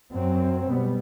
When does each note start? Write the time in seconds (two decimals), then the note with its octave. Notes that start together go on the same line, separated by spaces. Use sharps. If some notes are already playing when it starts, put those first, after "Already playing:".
0.12 F#2 F#3 C4
0.66 B2 G3 B3